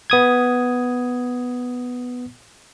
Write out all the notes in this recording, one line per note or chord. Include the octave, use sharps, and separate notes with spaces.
B3 D#6 G#6